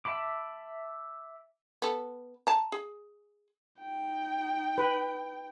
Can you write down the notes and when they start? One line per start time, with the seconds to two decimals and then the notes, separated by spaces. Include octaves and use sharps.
0.05 E5 A5 B5 D6
1.82 B3 A4
2.47 A5 A#5
2.72 G#4
3.80 D#4 G5
4.78 B4